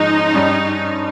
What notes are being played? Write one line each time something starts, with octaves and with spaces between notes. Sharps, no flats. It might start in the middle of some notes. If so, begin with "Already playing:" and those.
Already playing: G#2 F3 G#3 C#4 D#4
G2 G3 C#4